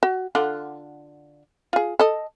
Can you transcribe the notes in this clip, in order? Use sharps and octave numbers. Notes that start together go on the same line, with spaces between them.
F#4
D3 F4 F#5
F4 G#4
A4 D#5